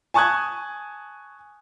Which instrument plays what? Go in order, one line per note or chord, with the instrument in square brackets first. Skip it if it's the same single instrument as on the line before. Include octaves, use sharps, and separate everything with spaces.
[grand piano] G#5 A5 C#6 D#6 F#6 G#6